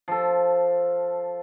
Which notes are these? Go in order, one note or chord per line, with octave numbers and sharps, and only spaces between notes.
F3 A4